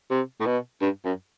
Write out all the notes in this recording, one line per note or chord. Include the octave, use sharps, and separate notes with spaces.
C3
A2
B2
G2
F#2